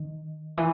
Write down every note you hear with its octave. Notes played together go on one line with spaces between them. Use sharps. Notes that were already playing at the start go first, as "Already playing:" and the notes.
Already playing: D#3
E3